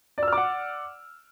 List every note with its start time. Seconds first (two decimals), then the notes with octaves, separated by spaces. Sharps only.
0.18 D5
0.23 E6
0.28 F6
0.33 D6
0.37 F#5